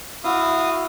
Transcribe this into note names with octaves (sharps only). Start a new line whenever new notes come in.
E4 F#4 F5 D#6